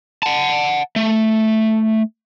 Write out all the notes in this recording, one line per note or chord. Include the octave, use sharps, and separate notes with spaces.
F#5 A5
A3